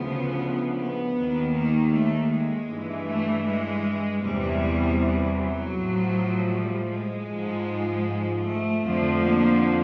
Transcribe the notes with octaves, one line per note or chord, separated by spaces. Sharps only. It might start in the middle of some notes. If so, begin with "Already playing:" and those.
Already playing: D2 C#3 F3 B3
B3
D#2 D#3
A#3
A3
G#3
G2 E3
A3
G#3
E2 C3 E3 G3
F#3
A2 F3
G3
G#3
G#2 F3
A3
F2 D3 F3
A#3